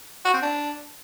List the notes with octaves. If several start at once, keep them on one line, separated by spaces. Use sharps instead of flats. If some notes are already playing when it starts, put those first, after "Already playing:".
F#4
C4
D4